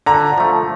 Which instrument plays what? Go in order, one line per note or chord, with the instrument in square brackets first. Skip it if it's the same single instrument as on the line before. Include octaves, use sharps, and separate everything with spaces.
[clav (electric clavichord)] D3 [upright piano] A#5
[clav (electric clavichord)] F3 A3